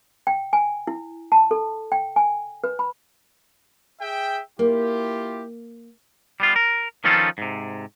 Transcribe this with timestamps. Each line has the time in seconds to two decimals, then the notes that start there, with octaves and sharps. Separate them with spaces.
0.27 G5
0.53 G#5
0.87 E4
1.32 A5
1.51 A4
1.92 G5
2.16 G#5
2.64 B4
2.79 B5
4.01 G#4 E5 G5
4.59 A#3 E4 F4 G4
6.40 G3 B3 F4
6.56 A#4
7.04 D#3 F3 C#4 D#4 F4 A4
7.38 G#2 C3